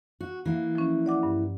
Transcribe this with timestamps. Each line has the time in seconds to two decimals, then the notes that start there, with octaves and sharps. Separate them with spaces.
0.21 F#4
0.46 E3 A#3
0.75 F3 C#4
1.06 D5 F#5 D6
1.23 G2